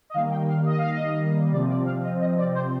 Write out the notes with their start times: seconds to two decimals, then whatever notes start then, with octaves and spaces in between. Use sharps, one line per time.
0.10 D#5
0.14 D#3 G3 A#3 F5
0.31 G5
0.48 F5
0.66 D#5
0.78 F5
0.91 D#5
1.51 C3 F3 C4 D5
1.69 D5
1.85 F5
2.03 D#5
2.20 D#5
2.38 D5
2.55 C5